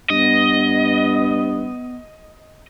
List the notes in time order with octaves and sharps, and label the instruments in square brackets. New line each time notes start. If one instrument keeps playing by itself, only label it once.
[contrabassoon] G2 [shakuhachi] B3 [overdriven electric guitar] D#5